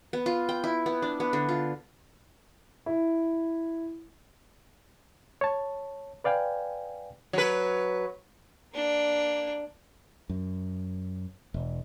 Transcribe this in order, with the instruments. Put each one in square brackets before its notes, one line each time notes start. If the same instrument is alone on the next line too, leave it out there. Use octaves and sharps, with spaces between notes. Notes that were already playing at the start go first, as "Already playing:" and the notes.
[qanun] B3
F4
G5
E4
B3
D4
B3
D3
F4
[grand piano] E4
[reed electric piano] C#5 A5
B4 D5 F5 G5 G#5
[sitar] F#3 B4
[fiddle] A#3 D4
[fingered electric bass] F#2
E1